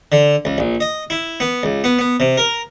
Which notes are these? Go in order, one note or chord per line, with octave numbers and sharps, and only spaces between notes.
D3
C#2
A#1
D#5
E4
B3
C#2
B3
B3
C3
A#4